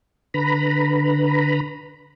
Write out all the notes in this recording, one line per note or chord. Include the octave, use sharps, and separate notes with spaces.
D3 B4 A#5 B5